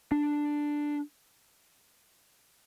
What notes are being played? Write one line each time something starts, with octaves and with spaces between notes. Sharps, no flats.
D4